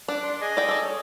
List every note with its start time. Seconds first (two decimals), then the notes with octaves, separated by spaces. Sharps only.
0.08 D4 D6 F#6
0.23 D5 C6
0.41 G#4 D#5 G#5
0.57 D5 G5
0.69 A4 D5
0.84 C#5